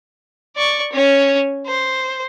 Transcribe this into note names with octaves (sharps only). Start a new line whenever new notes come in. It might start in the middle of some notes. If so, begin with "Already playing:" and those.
D5 C#6
C#4 C#5
C5